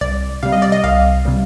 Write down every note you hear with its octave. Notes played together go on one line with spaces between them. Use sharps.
C2 D5
C3 G3 F5
D#5
D5
D#5
C2 F5
C3 G3